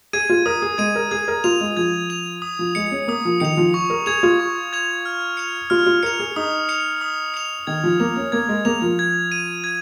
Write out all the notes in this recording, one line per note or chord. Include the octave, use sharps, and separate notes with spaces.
G#4 G#6 D#7
F4
A#4 D#6
G#4
G#3 G#6 D#7
A#4
G#4 G#6
A#4
F4 F7
G#3
F3 G#6
F7
D#6
F3
G#3 C#7 F7
C#4
A#3 D#6
F3
D#3 C#7 F7
F3
C#6
A#4
G#4 G#6 F7
F4
C#6
G#6 F7
F6
C#7 F7
F4 F6
F4
A#4 C#7 F7
G#4
D#4 D#6
C#7 F7
D#6
C#7 F7
D#3 G#6
F3
A#3 F7
C#4
A#3 G#6
G#3
A#3 F7
F3
G#6
D#7
G#6